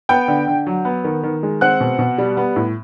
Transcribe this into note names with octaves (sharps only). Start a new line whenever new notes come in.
B3 G5 G6
D3
D3
F#3
B3
D#3
D#3
G#3
C4 F#5 F#6
B2
B2
G3
B3
A2